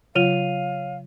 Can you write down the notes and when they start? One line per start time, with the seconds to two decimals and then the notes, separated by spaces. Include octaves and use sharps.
0.15 C#3 F#3 F4 C#5 F5 D#7 F7